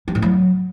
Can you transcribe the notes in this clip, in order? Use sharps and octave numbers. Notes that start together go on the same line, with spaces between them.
G3
A2
F#3